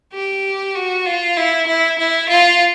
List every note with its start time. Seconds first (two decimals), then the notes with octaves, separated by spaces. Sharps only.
0.13 G4
0.75 F#4
1.06 F4
1.37 E4
1.67 E4
1.98 E4
2.29 F4